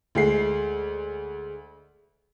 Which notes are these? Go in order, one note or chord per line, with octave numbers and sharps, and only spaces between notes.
D2 G#3 C7